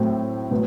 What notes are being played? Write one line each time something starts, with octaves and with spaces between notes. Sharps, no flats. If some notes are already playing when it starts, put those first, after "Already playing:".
Already playing: A2 F#3 A3 C4
A2 F#3 B3